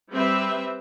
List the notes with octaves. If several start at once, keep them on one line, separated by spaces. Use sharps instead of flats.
G3 C4 B4 E5